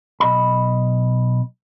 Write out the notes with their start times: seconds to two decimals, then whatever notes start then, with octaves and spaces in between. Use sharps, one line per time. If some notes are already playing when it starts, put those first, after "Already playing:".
0.20 B1 D#5 B5